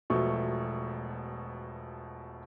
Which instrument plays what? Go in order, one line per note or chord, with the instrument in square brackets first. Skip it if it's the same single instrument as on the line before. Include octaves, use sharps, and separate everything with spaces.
[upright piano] E1 B2 F3 A3 C#6